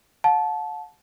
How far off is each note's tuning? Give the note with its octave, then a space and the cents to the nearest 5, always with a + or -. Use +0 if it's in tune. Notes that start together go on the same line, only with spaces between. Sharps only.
F#5 -45 A5 -20